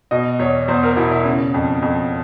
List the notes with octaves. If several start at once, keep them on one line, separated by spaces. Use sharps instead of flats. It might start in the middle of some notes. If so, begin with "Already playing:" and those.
B2 D#5
E2 C#5
E2 C5
A#4
B2 E4
E4
C#3
F2
F2